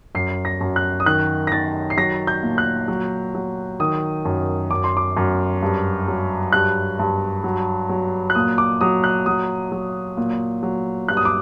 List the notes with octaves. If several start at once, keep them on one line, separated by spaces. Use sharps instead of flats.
F#2 C7
A#6
F#2
F#6
D#6
D#3 F#6
A#6
D#3 A6
C7
F#3 A#6
G6
A#2
F#6
F#3
F#3
D#3 D#6
F#2
F#2 D6
C6
D6
F#2
G2
F#3
G2 F#6
G2
F#3
F#3
F#6
A#2 D#6
D6
F#3 D#6
F#6
F#3 D#6
F#3
A#2
F#3
G2 F#6
D#6
D6